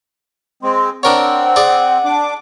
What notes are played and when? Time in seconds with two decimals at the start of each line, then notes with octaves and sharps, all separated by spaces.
0.63 G#3 C4 C6
1.03 C4 D4 A#4 C#5 F#5
1.56 G#4 D5 G#5
2.05 D4 D6